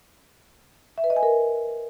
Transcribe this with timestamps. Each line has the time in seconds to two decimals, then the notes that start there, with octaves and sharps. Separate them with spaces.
0.98 E5
1.04 B4
1.10 D#5
1.16 G#5
1.23 A#4